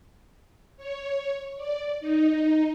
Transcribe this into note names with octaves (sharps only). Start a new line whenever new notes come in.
C#5
D5
D#4